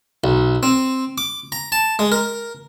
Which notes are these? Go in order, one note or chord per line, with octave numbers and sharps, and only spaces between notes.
B1
C4
D6
A#5
A5
G#3
A#4